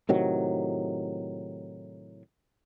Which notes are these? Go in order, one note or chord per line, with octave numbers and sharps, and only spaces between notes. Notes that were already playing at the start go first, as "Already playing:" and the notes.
A2 C3 D#3 F#3